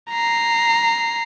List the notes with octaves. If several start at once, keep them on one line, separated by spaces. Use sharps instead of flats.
A#5 C7